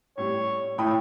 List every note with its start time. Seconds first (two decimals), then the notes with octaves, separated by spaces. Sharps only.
0.18 A2 G3 C#5
0.78 A2 C#5 G5 B5 D#6